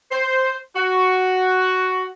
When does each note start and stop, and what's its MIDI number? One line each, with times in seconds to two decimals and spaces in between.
0.11 0.56 72
0.76 2.05 66